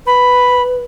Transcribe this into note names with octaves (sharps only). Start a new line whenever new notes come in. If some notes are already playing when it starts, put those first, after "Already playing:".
B4 B5